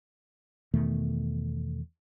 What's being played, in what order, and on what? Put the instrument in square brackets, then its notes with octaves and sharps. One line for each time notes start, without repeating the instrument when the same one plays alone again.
[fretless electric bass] E2 B2 D#3 A3